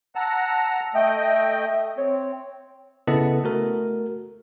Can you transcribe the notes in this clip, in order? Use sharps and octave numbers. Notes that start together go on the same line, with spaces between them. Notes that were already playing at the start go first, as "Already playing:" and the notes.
F#5 A5 A#5 E6
A3 D#5 E5 G5
C4 C#5
C#3 B3 E4 A4 D#5 A5
A3 F#4 A#4